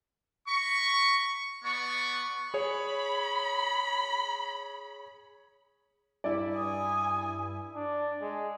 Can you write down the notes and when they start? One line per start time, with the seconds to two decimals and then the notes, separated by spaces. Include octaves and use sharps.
0.47 A#5 B5 C#6
1.64 B3 D5 C#6
2.54 G#4 C#5 B5
6.24 G2 E4 D5
6.56 G#5 D#6
7.75 D4
8.21 G#3